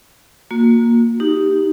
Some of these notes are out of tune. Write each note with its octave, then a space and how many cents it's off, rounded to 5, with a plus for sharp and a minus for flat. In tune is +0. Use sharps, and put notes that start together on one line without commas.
A#3 +0 F#4 -40
D#4 +0 G4 +0